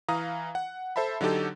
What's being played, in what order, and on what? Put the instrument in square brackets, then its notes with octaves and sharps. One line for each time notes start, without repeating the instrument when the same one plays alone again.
[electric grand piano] E3 F5 A#5 D#6
F#5
A4 C5 E5 A5 B5
D3 F#3 D#4 G4 A4